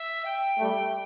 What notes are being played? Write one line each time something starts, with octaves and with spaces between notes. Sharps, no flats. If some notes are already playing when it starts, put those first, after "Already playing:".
Already playing: E5
G5
G3 A3